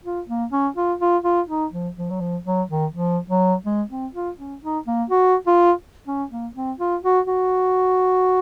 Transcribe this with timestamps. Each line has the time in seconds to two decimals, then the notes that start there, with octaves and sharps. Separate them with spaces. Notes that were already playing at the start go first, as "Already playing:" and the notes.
0.04 F4
0.29 A#3
0.52 C#4
0.77 F4
1.01 F4
1.24 F4
1.49 D#4
1.72 F3
1.98 F3
2.11 F#3
2.21 F3
2.46 F#3
2.70 D#3
2.93 F3
3.30 F#3
3.66 G#3
3.90 C4
4.14 F4
4.38 C#4
4.62 D#4
4.87 A#3
5.10 F#4
5.47 F4
6.08 C#4
6.31 A#3
6.55 C4
6.79 F4
7.03 F#4
7.27 F#4